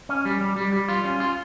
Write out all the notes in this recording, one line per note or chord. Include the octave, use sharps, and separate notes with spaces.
C#4
G3
G3
G3
G3
F4
C#4
F4